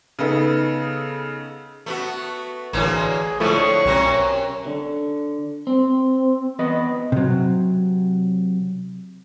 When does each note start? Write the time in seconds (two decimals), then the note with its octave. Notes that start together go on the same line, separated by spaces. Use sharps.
0.19 C#3 B3 D#4 A4
1.86 A3 B3 F#4
2.73 A1 D3 E3 F#3 A#3 G#4
3.40 A2 D3 F3 A3 E4 C#6
3.85 B1 F#2 C3 C#4 A#6
4.66 D3
5.67 C4
6.59 E2 B4 D#5
7.12 C3 F#3